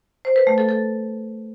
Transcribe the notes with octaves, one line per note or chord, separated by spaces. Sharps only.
C5
B4
A3
A4
A4